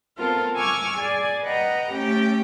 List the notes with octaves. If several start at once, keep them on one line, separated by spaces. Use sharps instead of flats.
B3 C4 F4 A4 A#4
G#5 C#6 D6 E6 F6 G#6
G#4 D5 G#5
B4 D#5 F#5 G5 A#5
A3 C#4 G4 G5